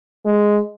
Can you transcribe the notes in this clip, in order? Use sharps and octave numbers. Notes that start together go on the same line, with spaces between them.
G#3